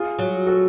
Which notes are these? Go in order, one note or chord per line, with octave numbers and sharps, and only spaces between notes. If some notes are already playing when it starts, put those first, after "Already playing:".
Already playing: F4 G#4
F#3
F#4 A4